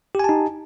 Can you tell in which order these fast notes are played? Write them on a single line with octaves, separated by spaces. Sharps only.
G4 G#5 A5 D#4